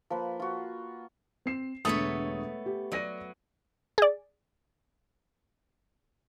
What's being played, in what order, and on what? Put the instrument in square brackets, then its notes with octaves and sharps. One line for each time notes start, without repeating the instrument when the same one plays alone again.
[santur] F3 A#3 B4
F4 F#4
[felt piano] C4 C7 E7
[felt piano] E1 D3 D#6 [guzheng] A3 B3 C#5
[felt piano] G4
[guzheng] F#3 [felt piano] D5 A#6 D#7
[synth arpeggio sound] G#4 D5